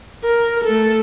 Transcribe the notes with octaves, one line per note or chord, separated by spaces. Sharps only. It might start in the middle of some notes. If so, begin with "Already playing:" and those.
A#4
A3 A4